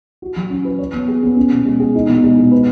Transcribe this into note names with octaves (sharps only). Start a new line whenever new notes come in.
F#4
F#3
C#4
B4
C#5
B3
G#4
B3
C#4
B2
G#3
G#4
D#4
B2
G#3
B2
B4